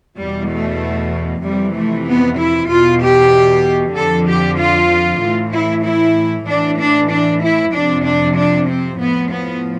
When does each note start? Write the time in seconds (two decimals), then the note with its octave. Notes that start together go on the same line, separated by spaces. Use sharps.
0.18 E2 B2 G3
0.50 A3
1.43 F2 C3 E3 G3
1.75 A3
2.07 B3
2.39 E4
2.70 E2 B2 F4
3.01 G4
3.96 F2 D3 F3 A4
4.27 G4
4.59 F4
5.22 A2 E3
5.53 E4
5.85 E4
6.48 A2 E3 D4
6.79 D4
7.10 D4
7.42 E4
7.74 F2 C3 F3 D4
8.05 D4
8.37 D4
8.69 C4
8.99 A2 F3 B3
9.31 B3